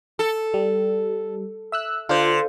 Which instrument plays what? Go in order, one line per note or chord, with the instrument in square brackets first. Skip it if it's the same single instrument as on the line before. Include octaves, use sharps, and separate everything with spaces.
[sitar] A4
[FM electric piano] G3
E5 E6 F#6
[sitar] D3 [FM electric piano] F4 C5